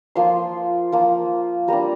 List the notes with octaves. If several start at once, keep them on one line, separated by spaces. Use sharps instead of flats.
F3 A#3 F4 C6
F3 A#3 F4
G3 A#3 D4 A#5